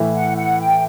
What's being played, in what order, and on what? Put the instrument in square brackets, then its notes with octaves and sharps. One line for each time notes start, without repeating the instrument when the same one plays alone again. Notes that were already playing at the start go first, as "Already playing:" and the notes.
Already playing: [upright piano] A2 E3 A3
[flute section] F#5
F#5
G5